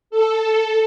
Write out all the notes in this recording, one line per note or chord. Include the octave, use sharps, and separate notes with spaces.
A4